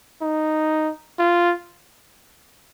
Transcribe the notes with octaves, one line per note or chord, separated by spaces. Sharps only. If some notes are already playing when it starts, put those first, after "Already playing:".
D#4
F4